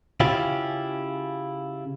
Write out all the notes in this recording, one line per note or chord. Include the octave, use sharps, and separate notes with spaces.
C#3 C#4 E4 F4 G4